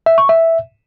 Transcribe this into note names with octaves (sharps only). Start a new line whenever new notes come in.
E5
C#6
E5